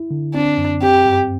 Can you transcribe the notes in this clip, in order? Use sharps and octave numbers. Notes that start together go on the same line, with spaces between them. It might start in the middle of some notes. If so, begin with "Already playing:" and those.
Already playing: E4
D3
C4 D4
F#2
C4 G4
G2